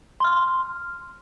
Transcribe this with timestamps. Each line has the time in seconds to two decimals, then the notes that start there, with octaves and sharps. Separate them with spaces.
0.20 C6 F6